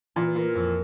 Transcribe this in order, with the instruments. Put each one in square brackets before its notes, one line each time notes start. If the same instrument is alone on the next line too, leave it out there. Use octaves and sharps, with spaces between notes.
[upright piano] A#2 [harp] E3
[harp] A#3 F4 A#4
F2